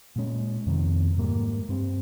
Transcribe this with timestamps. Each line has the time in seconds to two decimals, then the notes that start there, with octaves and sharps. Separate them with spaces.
0.16 A#2 G#3 C#4
0.67 F2 C3 D#3
1.18 G#2 G3 A#3
1.69 G2 G3 C4